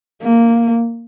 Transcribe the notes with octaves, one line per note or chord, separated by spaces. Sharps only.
A#3